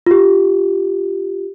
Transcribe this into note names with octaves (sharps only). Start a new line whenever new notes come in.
F4 G4